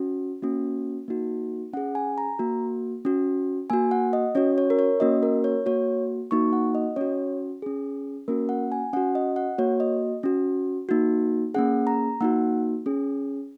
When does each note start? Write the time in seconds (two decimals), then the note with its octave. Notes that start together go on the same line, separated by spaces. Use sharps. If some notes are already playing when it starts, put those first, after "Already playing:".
Already playing: C#4 F#4
0.42 A#3 C#4 F#4
1.08 A#3 D#4 F#4
1.73 C#4 F#5
1.77 G#4
1.95 G#5
2.18 A#5
2.39 A#3 F#4
3.05 C#4 F#4
3.70 A#3 F#4 G#5
3.91 F#5
4.13 D#5
4.35 C#4 F#4 C#5
4.58 C#5
4.70 A#4
4.79 C#5
5.00 A#3 C#4 F#4 D#5
5.23 A#4
5.44 C#5
5.66 A#3 F#4 C#5
6.31 A#3 D#4 F#4 C#6
6.53 F#5
6.75 D#5
6.96 C#4 F#4 C#5
7.62 C#4 G#4
8.28 A#3 C#4 F#4 A#4
8.49 F#5
8.72 G#5
8.93 C#4 F#5
8.97 F#4
9.15 D#5
9.36 F#5
9.58 A#3 F#4 C#5
9.80 D#5
10.23 C#4 F#4
10.89 A#3 D#4 F#4
11.54 A#3 C#4 G#4 F#5
11.87 A#5
12.21 A#3 D#4 F#4 F#5
12.86 C#4 G#4